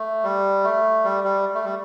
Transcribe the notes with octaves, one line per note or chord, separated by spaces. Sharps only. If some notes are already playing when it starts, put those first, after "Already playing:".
Already playing: A3
G3
A3
G3
G3
A3
G3